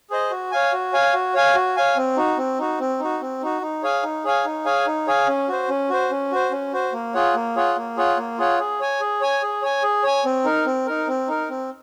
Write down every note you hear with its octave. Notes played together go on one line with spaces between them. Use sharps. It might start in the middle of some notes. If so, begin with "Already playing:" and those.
G#4 C5 D#5
F#4
C#5 F5 G#5
F#4
C#5 F5 G#5
F#4
C#5 F5 G#5
F#4
C#5 F5 G#5
C4
D#4 F#4
C4
D#4 F#4
C4
D#4 F#4
C4
D#4 F#4
D#4
G#4 C#5 F5 G#5
D#4
G#4 C#5 F5 G#5
D#4
G#4 C#5 F5 G#5
D#4
G#4 C#5 F5 G#5
C#4
F#4 C5
C#4
F#4 C5
C#4
F#4 C5
C#4
F#4 C5
A#3
F4 G#4 C#5 F#5
A#3
F4 G#4 C#5 F#5
A#3
F4 G#4 C#5 F#5
A#3
F4 G#4 C#5 F#5
G#4
C#5 G#5
G#4
C#5 G#5
G#4
C#5 G#5
G#4
C#5 G#5
C4
D#4 A#4
C4
D#4 A#4
C4
D#4 A#4
C4